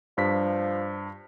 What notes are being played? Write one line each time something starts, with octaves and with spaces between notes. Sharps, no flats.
G2 F3 B6